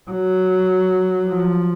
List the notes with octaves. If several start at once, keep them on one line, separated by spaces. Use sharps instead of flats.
F#3
F3